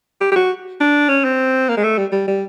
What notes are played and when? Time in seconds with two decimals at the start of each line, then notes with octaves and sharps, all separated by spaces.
0.21 G4
0.31 G4
0.36 F#4
0.80 D4
1.09 C#4
1.24 C4
1.69 A#3
1.77 G#3
1.83 A3
1.98 G3
2.12 G3
2.28 G3